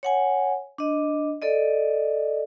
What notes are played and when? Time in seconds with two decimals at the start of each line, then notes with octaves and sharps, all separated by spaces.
0.03 C#5 F#5 G#5
0.78 D4 D#5
1.42 A4 D5 D#5